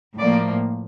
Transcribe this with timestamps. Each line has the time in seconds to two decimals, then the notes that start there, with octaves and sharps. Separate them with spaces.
0.17 A2 F3 A#3 D5